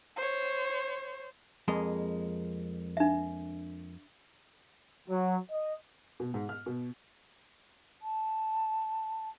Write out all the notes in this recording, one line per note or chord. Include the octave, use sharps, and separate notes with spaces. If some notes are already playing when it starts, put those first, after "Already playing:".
C5 C#5
F2 G#3 A#3
D4 E5
F#3
D#5
B2
G#2
F6
B2
A5